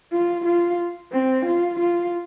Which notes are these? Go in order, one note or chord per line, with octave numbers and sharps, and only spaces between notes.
F4
F4
C4
F4
F4